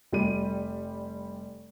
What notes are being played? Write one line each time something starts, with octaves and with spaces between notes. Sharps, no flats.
F1 G3 D#7